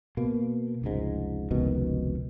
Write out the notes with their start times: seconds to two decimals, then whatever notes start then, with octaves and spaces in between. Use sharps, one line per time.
0.17 B2 A#3
0.82 F1 C#2 G#2
1.51 F1 C#2 B2 D#3